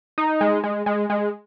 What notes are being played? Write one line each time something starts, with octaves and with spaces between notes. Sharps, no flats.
D#4
G#3
G#3
G#3
G#3